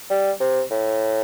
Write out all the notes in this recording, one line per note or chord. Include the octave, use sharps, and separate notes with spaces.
G3
C3
A2